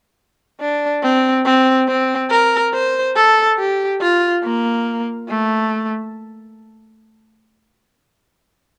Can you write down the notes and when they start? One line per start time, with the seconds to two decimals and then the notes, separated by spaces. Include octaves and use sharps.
0.60 D4
1.03 C4
1.45 C4
1.88 C4
2.30 A#4
2.73 C5
3.16 A4
3.58 G4
4.01 F4
4.43 A#3
5.29 A3